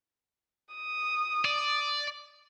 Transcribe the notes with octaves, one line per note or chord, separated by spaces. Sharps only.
D#6
D5